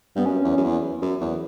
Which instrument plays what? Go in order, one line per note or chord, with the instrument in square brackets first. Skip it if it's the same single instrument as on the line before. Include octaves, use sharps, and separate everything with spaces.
[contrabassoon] G2 [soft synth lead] B3
[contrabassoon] F#2 [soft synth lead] C#4
[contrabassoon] E2
F#2
E2
F#2
E2